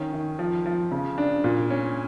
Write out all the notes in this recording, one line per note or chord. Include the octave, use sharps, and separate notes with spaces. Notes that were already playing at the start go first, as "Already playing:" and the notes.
Already playing: D#3 C#4
D#3
F3
F3
C#3
D4
A#2
C#4